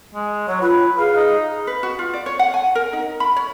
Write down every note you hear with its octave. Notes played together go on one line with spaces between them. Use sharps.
G#3
F#3 C#5
F4 B4
G#4 F5
D#4
B4
F#4
F4
D5
C#5
F#5
G#5
A#4
D#4
B5
C#5